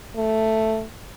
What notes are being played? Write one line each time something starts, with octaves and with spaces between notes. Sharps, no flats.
A3